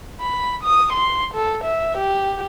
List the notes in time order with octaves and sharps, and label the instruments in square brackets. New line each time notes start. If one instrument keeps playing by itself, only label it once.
[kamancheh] B5
D#6
C6
A4
E5
G4